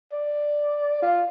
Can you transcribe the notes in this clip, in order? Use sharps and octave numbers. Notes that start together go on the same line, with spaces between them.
D5
F4